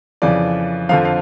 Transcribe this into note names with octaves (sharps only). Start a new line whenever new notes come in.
F2 C#3 E3 D5
F2 D3 F3 F5
F5